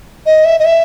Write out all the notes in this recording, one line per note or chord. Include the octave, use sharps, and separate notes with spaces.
D#5
E5
D#5
E5